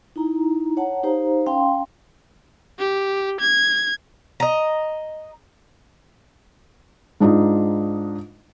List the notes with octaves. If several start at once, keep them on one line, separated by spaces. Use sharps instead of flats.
D#4 E4 A#5
C#5 F#5 A5 A#5
D#4 G4 C5 F5 A#5
C#4 F5 G5 A5 C6
G4
G#6
D#5 A#5
G#2 D4 D#4 F4